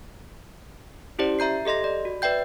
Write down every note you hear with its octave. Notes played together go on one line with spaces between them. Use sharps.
C#4 E4 G4 C5 D5
E5 A#5 G6 C7
G4 A4 D#5 C6 A#6
D5
F#4
B4 D5 E5 G5 G6